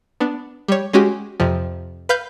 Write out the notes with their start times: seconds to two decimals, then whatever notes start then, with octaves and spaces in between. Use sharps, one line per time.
0.20 B3 D4
0.68 G3 C#5
0.93 G#3 C#4 F#4 G4
1.40 F2 C3 F3
2.09 B4 F5 G6